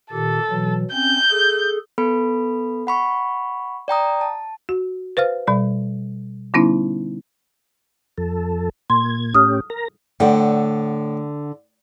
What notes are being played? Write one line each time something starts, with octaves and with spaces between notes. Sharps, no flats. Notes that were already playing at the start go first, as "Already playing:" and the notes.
A#2 D#3 G4 A4
B2 E3 F#3
C4 C#4 G6
G#4 A4
B3 A4 B5
F#5 B5 C#6
D5 G5 A#5 D#6
A5
F#4
B4 C5 F5 F6
B2 G3 D5
D3 G3 B3 C#4 D#4 E4
F2 A4
A#2 C6 G#6
A2 C#4 G4 D#6 F6
A#4 A#5
A2 D3 F#5 G5